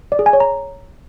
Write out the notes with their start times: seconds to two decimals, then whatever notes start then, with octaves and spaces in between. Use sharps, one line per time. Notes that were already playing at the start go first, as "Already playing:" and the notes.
0.12 D5
0.19 G#4
0.26 G#5
0.33 C#5
0.40 A#5